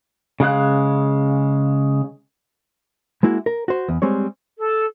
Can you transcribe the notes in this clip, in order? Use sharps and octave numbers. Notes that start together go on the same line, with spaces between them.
C#3 G#3 F5 F#6
G#3 A#3 E4 F#4
A#4
F#4 C5
E2
G3 G#3 C4 C#5
A4